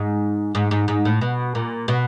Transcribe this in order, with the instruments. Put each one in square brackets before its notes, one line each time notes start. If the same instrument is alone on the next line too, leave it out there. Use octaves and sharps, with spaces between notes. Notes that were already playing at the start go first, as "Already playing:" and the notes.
Already playing: [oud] G#2
G#2
G#2
G#2
A2
B2
A#2
B2